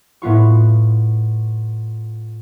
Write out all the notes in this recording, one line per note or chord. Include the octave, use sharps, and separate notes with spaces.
A2 B3 F4 C#6